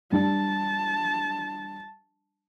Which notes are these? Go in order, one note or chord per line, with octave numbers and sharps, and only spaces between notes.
G3 D4 A5